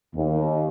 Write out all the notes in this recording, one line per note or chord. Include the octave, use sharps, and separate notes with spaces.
D#2